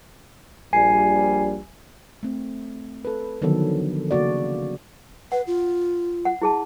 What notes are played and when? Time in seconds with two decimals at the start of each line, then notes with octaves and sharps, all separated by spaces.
0.73 A#1 G3 G#5 C7
2.23 A3 C4
3.05 A4 B4
3.42 D3 D#3 F3 F#3 B3 A4
4.11 C#3 A#3 F#4 D5
5.32 B4 F#5
5.47 F4
6.25 F#5
6.42 E4 G#4 A5